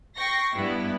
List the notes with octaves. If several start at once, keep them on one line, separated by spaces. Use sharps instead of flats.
G5 C#6 A#6 C7
G2 G3 B3 E4